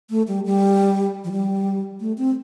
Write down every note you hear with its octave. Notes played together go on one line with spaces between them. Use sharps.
A3
G3
G3
F3
G3
A3
C4